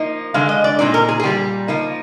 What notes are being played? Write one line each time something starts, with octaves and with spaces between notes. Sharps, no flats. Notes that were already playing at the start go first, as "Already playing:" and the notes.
Already playing: F3 A#3 D#4
D3 G#3 D4 F5
D#5
D5
A#2 F3 C4 D#4 D5
A#4
G#4
G#4
A#2 G3 A#3 G4
F3 A#3 D#4